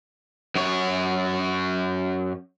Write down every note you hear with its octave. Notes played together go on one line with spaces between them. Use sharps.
F#2 C#5